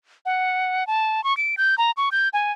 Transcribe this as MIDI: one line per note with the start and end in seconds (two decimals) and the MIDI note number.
0.26 0.87 78
0.87 1.23 81
1.24 1.36 85
1.37 1.55 98
1.57 1.75 91
1.78 1.91 82
1.97 2.09 85
2.12 2.29 91
2.33 2.52 80